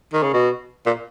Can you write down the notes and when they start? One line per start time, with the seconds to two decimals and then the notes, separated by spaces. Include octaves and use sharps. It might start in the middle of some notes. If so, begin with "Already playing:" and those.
0.13 D#3
0.23 C#3
0.33 B2
0.86 A#2